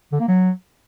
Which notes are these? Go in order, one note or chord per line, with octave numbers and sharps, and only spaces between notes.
D3
A#3
F#3